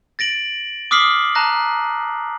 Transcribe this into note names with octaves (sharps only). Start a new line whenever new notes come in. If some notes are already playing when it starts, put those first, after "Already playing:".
A6 A#6 D7 F#7
D6 D#6 F6 B6 C7 F#7
A5 A#5 F#6 A#6